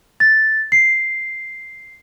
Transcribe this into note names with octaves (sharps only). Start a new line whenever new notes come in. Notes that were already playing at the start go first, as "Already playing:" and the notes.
A6
C7